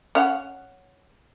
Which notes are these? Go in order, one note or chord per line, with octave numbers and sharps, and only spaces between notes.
C#4 F5 F#5